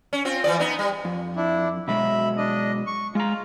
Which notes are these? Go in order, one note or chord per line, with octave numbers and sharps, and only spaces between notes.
C#4
C4 F4
E3 F3 D5
B3 D#4
G3
F2
D4 E4
B2 F#3 G#3 E5 B5
D4 D#5
C#6
G#3 F4 A#5